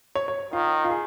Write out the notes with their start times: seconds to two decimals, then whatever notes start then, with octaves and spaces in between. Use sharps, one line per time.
0.15 C#5
0.28 C#5
0.53 D#3 F4
0.84 F4
0.90 G#4